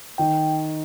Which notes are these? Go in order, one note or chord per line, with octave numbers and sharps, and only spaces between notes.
D#3 G5